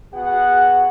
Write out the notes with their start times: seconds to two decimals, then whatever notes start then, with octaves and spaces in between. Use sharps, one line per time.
0.14 B3 F#4 G#4 F#5